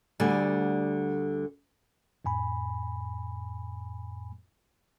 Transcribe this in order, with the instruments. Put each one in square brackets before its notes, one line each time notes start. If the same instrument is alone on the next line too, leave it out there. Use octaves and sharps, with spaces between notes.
[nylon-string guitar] D2 D3 G3 D5 G#5
[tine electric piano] F2 A2 G#5 B5